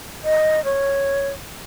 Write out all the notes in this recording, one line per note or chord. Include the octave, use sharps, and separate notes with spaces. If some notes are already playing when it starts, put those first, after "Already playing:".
D#5
C#5